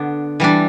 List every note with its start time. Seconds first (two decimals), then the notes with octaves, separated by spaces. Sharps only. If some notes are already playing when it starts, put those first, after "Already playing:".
Already playing: D3 B3 D4
0.40 E3 G3 D4